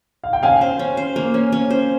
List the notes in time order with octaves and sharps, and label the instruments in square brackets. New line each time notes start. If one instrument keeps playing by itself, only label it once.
[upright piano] F5
G5
[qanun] C#4 [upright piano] F5 G#5
[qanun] C5
C#4
C5
A#3
C#4
C#4
C5